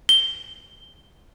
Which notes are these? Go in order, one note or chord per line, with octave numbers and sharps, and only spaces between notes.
G7